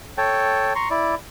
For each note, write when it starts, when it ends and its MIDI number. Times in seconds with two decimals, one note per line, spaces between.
0.18 0.73 69
0.18 0.73 73
0.18 0.73 79
0.18 0.73 81
0.75 0.89 82
0.75 0.89 84
0.75 0.89 85
0.90 1.15 64
0.90 1.15 74